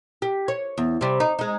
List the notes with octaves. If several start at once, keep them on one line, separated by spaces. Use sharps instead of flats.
G4
C#5
E2
C3 G3
D#4
G#3 D#4